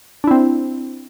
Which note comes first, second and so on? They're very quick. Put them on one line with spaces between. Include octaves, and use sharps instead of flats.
D4 E4 C4